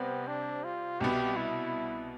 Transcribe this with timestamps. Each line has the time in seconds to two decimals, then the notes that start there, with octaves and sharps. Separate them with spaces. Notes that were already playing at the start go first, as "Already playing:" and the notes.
Already playing: C3 G3 B3 C4
0.27 D4
0.64 F4
1.00 C2 B2 B3 G4
1.37 E4